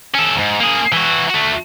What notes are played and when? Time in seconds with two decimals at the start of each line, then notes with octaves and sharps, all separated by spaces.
0.15 C#4 A4
0.36 D#2 G#2
0.60 A#3 G#4
0.92 E3 F#4
1.29 A3 F#4